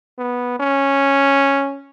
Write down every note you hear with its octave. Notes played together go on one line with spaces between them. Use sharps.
B3
C#4